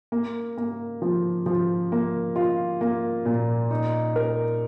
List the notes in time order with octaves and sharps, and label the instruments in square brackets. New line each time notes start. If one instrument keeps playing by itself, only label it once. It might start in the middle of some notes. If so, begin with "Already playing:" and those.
[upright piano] A#3
A#3
F3
F3
A#3
F4
A#3
A#2
D#4
A#4